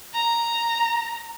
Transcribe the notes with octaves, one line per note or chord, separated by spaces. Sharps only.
A#5